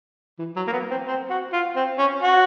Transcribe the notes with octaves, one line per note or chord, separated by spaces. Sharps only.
E3
F#3
A#3
B3
C4
C4
F#4
F4
C4
C#4
F#4